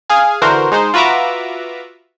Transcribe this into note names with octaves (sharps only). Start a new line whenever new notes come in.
G#4 F5 G#5
D3 E3 F#4 A#4 C5
G#3 D#4 C5
F4 F#4 B4 E5 A#5 D6